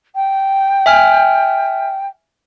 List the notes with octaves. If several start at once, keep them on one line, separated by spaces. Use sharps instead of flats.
G5
E5 G#5 F6